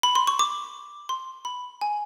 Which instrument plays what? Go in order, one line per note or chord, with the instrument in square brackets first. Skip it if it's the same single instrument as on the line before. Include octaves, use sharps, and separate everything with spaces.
[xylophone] B5
C6
C#6
D6
C6
B5
G#5